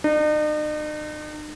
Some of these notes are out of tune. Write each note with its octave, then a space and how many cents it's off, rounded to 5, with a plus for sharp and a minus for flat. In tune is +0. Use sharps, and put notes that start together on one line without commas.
D#4 -45